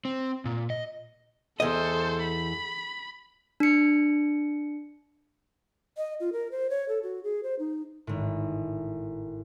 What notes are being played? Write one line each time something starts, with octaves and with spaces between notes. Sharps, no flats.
C4
A#2
D#5
E2 A4 C5 D#5
B5
D4 C#7
D#5
F4
A#4
C5
C#5
A4
F#4
G#4
C5
D#4
G#1 A2